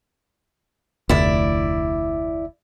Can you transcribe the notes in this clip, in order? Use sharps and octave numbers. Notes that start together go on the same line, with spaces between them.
F1 D2 E4 D5